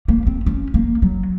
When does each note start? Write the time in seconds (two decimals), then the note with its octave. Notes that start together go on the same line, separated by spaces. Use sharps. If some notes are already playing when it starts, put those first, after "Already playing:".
0.08 A#3
0.27 C4
0.46 C#4
0.74 A#3
1.02 F#3